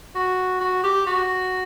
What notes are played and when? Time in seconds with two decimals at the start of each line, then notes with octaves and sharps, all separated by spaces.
0.15 F#4
0.60 F#4
0.83 G4
1.06 F#4